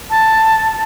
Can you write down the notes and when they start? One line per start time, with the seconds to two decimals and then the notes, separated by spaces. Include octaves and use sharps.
0.10 A5